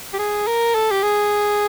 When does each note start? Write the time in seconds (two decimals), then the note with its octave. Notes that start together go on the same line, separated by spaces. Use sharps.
0.13 G4
0.19 G#4
0.47 A#4
0.75 A4
0.91 G4
1.02 G#4